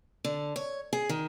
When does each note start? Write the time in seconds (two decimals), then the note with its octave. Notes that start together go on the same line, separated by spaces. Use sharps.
0.25 D3
0.56 C#5
0.93 G#4
1.09 D#3